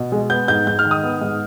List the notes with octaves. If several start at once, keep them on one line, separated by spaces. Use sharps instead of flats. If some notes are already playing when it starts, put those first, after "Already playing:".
Already playing: B2
G#3
B3 G6
G#2 G6
G#2 G6
F6
D#3
D#6
B3
G#2